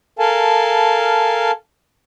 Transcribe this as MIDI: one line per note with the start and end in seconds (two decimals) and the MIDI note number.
0.19 1.51 69
0.19 1.51 70
0.19 1.51 77
0.19 1.51 80
0.19 1.51 81